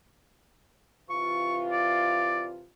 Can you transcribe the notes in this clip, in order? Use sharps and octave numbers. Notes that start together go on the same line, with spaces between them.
C3 E3 F4 C#6
D5